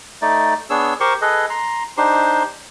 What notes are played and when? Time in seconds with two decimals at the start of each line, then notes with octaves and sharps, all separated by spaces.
0.22 A3 D#4 D5
0.70 B3 D4 G#4 C#5 E6
1.00 G4 A#4 C5 C6 C#6
1.22 G#4 A4 B4 D#5
1.50 A#5 C6
1.97 D4 D#4 G4 C5 C6